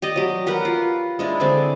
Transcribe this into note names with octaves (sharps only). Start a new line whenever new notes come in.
G4 D5 D#5
F#3 G4
G4 A#4 B4 F#5
F4
G#3 D4 E4
D3 C4 G#4 D5